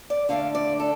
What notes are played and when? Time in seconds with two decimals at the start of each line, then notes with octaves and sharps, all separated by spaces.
0.10 D5
0.29 D3 A3 D4 F5
0.55 D5
0.80 A4